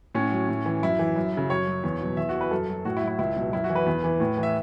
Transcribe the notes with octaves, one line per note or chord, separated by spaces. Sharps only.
A2 C#4
F#3
A2
E3
F#2 E4
E3
F#2
C#3 F#3
F#2 C#5
F#3
E2
B2 F#3
E2 E5
F#4
E3
B4
F#2 A4
F#3
A2 F#4
E4
F#3
E4
C#2 E4
B2 F#3
F#2 E4
F#4
E3
B4
E2
E3
A2
E3
E5